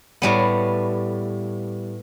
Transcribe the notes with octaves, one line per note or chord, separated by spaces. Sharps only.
A2 G3 B3